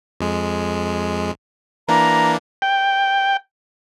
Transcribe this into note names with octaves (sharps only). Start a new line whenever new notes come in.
F2 G#3
E3 A#3 D4 A#5
G5